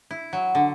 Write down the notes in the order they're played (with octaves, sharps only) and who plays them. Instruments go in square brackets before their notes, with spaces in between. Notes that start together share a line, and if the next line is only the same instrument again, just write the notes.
[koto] E4
F#3
D3